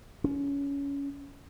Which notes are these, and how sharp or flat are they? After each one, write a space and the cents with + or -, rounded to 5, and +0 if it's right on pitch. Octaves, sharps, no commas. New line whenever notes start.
C#4 +20